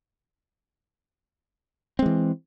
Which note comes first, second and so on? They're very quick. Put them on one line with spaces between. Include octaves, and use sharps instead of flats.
C4 G#3 E3